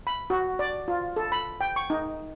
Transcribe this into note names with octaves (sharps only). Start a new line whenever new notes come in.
B5
F#4
D5
F4
A4
B5
G5
C#6
D#4